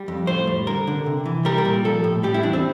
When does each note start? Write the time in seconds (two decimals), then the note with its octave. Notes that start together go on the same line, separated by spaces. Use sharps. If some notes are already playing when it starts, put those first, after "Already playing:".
Already playing: G3
0.08 F2
0.27 A2 C5
0.47 G3
0.67 D3 A#4
0.87 D3
1.06 C3
1.26 E3
1.45 G3 A#4
1.58 A#4
1.65 A#2
1.84 F3 A4
2.04 A2
2.23 G3 G4
2.34 E4
2.43 E2 D4
2.53 C4